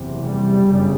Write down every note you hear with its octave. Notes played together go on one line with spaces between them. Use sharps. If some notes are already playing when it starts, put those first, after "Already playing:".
Already playing: F#1 E2 C3
G3
G1 F#2 C#3